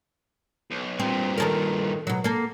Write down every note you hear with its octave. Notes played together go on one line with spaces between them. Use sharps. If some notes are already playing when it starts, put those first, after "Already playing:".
B1
G2 A#2 C4
D#3 A4 A#4
B2 F#3
A#3 A4